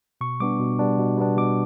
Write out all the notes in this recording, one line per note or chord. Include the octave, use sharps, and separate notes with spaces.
B2 C#6
G3 B3 D4 D6
B2
G3 B3 D4
B2
G3 B3 D4
B2 D6